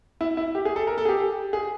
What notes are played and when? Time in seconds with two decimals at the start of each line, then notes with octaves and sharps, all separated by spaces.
0.21 E4
0.37 E4
0.55 G4
0.65 G#4
0.76 A4
0.87 A#4
0.98 A4
1.05 G#4
1.09 G4
1.53 G#4